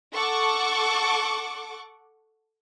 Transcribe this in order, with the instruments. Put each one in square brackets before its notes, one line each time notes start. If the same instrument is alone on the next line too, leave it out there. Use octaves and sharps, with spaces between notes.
[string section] A4 F#5 C#6 D6